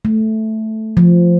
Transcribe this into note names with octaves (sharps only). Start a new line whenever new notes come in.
A3
F3